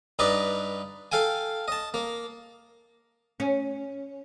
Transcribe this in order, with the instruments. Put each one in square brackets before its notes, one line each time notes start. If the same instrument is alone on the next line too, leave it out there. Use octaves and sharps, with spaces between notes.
[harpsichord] G2 D#4 B4 D5 A#5
A4 F5 G5 G#5
D#5 A5
A#3
[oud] C#4